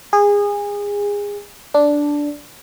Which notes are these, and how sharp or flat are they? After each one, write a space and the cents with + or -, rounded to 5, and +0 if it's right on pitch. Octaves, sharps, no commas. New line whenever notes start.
G#4 -25
D4 -5